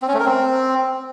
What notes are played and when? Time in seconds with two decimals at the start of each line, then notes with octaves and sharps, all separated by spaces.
0.02 C4
0.08 C#4
0.14 A3
0.20 A#4
0.26 C4